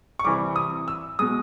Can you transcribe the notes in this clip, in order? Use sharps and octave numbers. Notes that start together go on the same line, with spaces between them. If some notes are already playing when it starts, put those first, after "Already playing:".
C#6
C3 E3 G3 D6
D#6
E6
B2 G#3 D#6